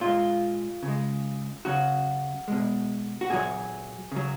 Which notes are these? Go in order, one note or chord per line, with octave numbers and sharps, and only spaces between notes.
A#2 G#3 F4
C#3
G#3
C#3 F#3 F#4
B2 G#3
F#4
A#2 F#3 G#4
C#3 F#3